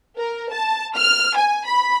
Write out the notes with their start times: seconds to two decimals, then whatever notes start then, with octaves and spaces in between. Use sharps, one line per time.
0.18 A#4
0.51 A5
0.96 F6
1.36 G#5
1.66 B5